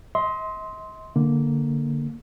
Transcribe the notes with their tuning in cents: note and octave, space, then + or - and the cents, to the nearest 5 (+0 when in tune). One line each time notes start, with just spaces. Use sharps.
D#5 +45 C6 +0
D3 +0 A#3 +0